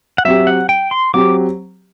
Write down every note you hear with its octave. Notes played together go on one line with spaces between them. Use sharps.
F#5
F#3 C4 G4 E5
F#5
G5
C6
F#3 C4 G4 D6